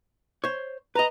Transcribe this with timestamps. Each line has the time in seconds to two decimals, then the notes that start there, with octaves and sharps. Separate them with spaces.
0.44 C5 C#5
0.95 B4 D#5 A#5